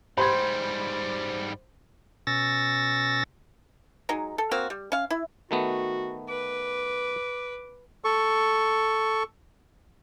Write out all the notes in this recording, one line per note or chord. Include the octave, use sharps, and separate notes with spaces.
G#2 G3 C5 B5 C6 G#6
B2 C#4 E6 A6 A#6
F#3 G#3 D#4
A4
A#3 C4 F#4 F5
G3
C#4 F5
E4
D#3 A3 B3 F#4
B4 D6
A4 C#6